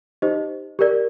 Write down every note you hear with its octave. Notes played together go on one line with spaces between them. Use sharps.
D#4 G4 C5 D#5
G4 A#4 D5